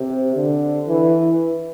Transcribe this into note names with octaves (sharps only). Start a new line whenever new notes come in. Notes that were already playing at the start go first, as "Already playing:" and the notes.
Already playing: C3
D3
E3